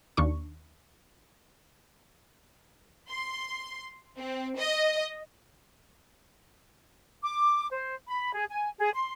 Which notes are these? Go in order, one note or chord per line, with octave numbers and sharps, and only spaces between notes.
D#2 D4 C#6
C6
C4
D#5
D6
C5
B5
G#4
G#5
G#4
C6